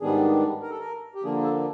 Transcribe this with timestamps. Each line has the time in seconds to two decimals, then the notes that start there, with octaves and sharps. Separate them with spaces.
0.01 G#2 D#3 G3 B3 D4 G#4
0.62 A#4
0.70 A4
0.79 A#4
1.15 G4
1.23 D3 F3 A#3 D4 G#4
1.44 A4